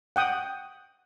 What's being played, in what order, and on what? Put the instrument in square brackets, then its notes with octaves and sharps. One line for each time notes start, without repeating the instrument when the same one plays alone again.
[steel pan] F#5 G5 D#6